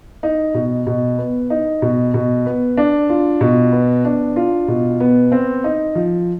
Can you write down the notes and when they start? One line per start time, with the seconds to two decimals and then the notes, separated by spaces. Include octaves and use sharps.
0.23 D#4
0.54 B2
0.87 B2
1.18 B3
1.50 D#4
1.82 B2
2.14 B2
2.46 B3
2.77 D4
3.09 F4
3.41 B2
3.72 B3
4.05 D4
4.36 F4
4.68 B2
5.00 B3
5.32 C4
5.64 D#4
5.95 F3